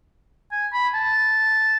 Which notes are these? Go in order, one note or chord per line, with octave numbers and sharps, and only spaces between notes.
G#5
B5
A5